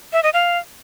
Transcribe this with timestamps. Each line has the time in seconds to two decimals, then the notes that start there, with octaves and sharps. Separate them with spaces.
0.13 E5
0.23 D#5
0.34 F5